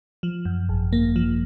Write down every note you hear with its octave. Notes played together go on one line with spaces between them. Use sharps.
F3
F#2
G#1
A#3
F3